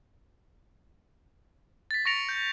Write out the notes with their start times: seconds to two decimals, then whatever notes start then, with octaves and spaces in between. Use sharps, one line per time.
1.91 A6 B6
2.05 C#6 A6 A#6 C#7 D7 F7
2.29 G6